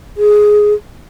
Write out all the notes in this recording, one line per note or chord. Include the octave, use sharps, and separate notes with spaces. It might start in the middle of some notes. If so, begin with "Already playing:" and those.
G#4